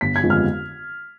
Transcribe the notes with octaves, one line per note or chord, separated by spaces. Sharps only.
G1 B6
G#6
F2 D3 G#3 B3
F6